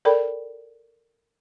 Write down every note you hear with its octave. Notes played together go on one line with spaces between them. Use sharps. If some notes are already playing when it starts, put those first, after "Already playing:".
A4 A#4 D5 G5 B5